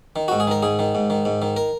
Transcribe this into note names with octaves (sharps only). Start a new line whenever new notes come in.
D#3
G#2 F#4
G#4
D#3 A#4
G#2 G#4
D#3
G#2
D#3
G#2
D#3
A#4